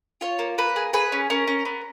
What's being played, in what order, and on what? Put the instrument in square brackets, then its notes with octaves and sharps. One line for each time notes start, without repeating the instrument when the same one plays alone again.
[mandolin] F4 C#5
A#3
A#3 B4
G#4
G#4 B4
C#4
C#4 A#4
C#4
B3